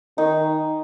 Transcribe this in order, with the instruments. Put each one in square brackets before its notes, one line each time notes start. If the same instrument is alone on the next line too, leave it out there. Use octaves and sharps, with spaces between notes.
[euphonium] D#3 [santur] D#4